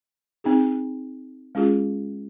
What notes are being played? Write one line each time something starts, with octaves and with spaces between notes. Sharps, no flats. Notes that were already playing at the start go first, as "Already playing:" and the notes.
C4 D#4 G#4
G#3 C#4 F4 G#4